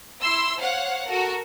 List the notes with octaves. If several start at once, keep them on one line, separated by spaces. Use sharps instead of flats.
E4 C6 E6
C5 C#5 F5 F#5
F#4 A4 A#4